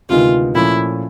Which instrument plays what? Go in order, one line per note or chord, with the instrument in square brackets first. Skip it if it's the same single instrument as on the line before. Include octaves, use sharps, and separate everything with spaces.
[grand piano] D2 C3 D#3 G#3 B3 [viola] F4
[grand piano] A#2 F3 A3 C#4 [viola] E4